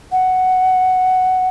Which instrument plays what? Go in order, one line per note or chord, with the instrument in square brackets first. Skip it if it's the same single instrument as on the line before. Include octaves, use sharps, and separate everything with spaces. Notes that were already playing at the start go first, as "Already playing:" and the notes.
[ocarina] F#5